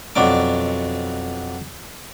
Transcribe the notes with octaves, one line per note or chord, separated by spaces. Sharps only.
F2 B2 F#3 D4 D6